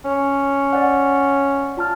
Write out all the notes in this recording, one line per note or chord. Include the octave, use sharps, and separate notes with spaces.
C#4
D5 F#5
F4 A5 F6